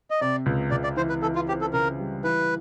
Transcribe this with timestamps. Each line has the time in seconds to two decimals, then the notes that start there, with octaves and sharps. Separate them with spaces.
0.10 D#5
0.21 C3 D5
0.46 C#2
0.71 C#2 D5
0.84 D5
0.97 E3 C5
1.09 B4
1.22 E3 A4
1.35 F4
1.48 C4 G4
1.61 A4
1.73 C#3 A#4
1.99 G3
2.24 E3 B4